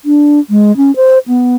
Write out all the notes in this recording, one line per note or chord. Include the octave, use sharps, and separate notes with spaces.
D4
G#3
C#4
C5
B3